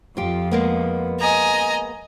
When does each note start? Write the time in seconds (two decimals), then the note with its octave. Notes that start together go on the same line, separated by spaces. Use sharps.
0.17 F2 F4 G4
0.51 G#3 A#3 B3
1.20 D#5 G#5 A#5